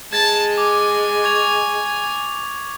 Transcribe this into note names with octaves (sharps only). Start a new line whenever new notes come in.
G#3 A5 G#6 A6
G#5 D6
C#6 G#6 F7